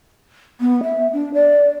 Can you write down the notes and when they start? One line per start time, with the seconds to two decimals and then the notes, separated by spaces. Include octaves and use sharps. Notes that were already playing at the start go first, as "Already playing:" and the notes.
0.61 B3
0.83 E5
1.13 D4
1.34 D5